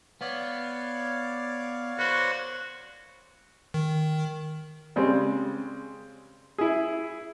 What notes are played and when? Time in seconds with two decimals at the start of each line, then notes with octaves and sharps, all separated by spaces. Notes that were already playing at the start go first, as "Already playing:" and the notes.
0.21 B3 C#5 D5 F5
1.99 F#4 B4 C5
3.74 D#3
4.96 C#3 G3 G#3 C4
6.58 E4 G#4